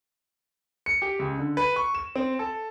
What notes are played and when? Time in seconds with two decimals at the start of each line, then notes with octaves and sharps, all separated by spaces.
0.86 C#7
1.02 G4
1.19 C#2
1.39 D3
1.57 B4
1.76 C#6
1.95 E7
2.16 C4
2.39 A4